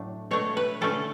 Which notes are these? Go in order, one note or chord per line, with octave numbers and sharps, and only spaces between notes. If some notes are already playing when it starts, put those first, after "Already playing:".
Already playing: A2 F#3 A3 D4
B2 A3 D4 C#5
B4
D3 A3 C#4 E4 A4